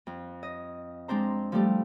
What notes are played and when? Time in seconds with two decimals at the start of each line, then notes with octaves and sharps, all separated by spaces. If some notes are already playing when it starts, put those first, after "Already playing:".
0.07 F2
0.43 D#5
1.08 G#3 C4 D4 C5 A#5
1.52 F3 G3 A3 G4